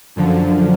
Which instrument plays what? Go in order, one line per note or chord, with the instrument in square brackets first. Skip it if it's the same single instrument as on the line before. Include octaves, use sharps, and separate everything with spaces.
[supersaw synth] F#2 D3 F3